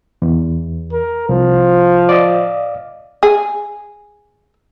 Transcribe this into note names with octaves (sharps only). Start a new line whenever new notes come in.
E2
A#4
C2 F3
D5 D#5 F5
G#4